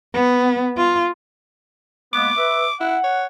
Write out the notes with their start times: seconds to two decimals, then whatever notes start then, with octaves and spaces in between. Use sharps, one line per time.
0.14 B3
0.77 F4
2.13 G#3 A#3 B3 D6
2.37 B4 E5
2.81 E4 F#5
3.04 C#5